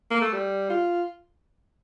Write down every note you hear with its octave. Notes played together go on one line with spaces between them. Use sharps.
A#3
A3
G3
F4